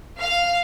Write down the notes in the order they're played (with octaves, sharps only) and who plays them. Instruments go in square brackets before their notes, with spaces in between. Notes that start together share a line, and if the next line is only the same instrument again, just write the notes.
[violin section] F5